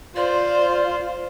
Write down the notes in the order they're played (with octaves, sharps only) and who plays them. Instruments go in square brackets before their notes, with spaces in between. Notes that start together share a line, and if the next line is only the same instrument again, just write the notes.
[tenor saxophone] F4 [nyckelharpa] C5 [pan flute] D5